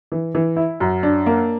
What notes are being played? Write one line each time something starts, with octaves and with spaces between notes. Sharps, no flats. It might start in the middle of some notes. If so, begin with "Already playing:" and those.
E3
E3
E4
F#2
D4
A#3